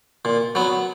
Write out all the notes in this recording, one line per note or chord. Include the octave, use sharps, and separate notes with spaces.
A#2
F#3 B3